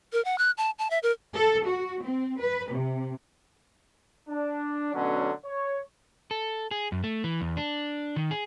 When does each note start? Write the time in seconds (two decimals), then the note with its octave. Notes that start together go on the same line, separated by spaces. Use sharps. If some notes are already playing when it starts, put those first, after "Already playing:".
0.13 A#4
0.25 F#5
0.38 F#6
0.58 A5
0.79 A5
0.90 E5
1.03 A#4
1.33 A4
1.66 F#4
2.01 C4
2.40 B4
2.71 C3
4.29 D4
4.94 B2 D3 F#3 A3 C#4
5.45 C#5
6.31 A4
6.71 G#4
6.92 F#2
7.04 A3
7.24 E3
7.41 E2
7.57 D4
8.16 D#3
8.31 G#4